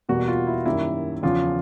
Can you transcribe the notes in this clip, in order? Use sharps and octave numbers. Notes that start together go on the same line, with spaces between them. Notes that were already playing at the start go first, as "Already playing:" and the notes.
E2 B2 G3 A#3 F#4
F4
E4
F#2 D#3 G3 A#3 E4
E2 C#3 F3 F4